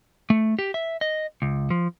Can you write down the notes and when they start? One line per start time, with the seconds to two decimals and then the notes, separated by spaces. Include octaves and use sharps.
0.30 A3
0.59 G4
0.74 E5
1.01 D#5
1.42 C#2
1.70 F3